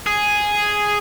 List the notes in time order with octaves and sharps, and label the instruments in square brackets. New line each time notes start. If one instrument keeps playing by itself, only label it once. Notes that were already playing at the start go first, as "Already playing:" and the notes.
[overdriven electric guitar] G#4